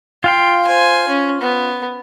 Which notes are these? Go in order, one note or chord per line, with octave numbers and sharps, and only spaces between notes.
F4 F5 G5 C6
C5 G#5
C#4
B3